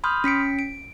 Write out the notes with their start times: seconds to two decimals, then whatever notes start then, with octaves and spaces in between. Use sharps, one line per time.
0.04 B5 C6 D#6 F6 G6
0.24 C#4 B6 C#7 D7
0.59 D7